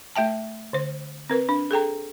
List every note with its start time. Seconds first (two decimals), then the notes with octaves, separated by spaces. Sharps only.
0.16 A3 E5 G5 A5
0.73 D3 C5
1.30 C4 A#4 B4
1.49 D4
1.71 G#4 A4 G5 A#5